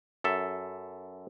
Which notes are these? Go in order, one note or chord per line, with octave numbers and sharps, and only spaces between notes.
F#2 A4 E5